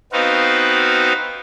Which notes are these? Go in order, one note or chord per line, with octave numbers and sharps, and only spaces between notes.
B3 C4 D#4 F#4 F5